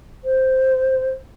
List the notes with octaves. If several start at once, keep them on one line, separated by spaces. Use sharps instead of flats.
C5